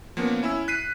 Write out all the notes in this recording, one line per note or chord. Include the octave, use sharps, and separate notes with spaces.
F3 A#3 B3 C#4
C#4 E4 G#5 E6
F#6 B6 C7 D#7